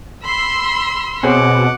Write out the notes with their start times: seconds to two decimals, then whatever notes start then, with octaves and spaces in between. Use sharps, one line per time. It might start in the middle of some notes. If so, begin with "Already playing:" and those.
0.24 B5 C6 E6
1.23 B2 C4 G#4 C#5 F#5 D6